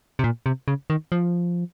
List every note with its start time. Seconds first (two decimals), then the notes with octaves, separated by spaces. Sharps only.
0.19 C3
0.24 A#2
0.46 C3
0.68 C#3
0.90 D#3
1.12 F3